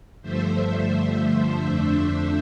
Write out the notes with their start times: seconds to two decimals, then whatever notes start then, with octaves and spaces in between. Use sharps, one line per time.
0.22 G2 D3 F3 A3 C5 E5
1.60 F2 D3 A3 D4 C5 E5